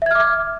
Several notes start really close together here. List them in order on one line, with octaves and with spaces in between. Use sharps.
E5 G#6 F6 D6